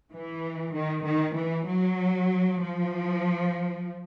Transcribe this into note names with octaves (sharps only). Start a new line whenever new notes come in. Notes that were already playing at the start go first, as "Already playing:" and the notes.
E3
D#3
D#3
E3
F#3
F3